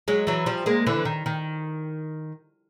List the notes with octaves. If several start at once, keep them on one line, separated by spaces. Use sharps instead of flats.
F#3 G#3
E3 F#3
F3 G3
G#3 A#3
D3 E3
D#3
D#3